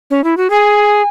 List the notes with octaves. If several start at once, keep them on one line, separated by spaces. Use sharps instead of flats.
C#4
E4
F#4
G#4 G#5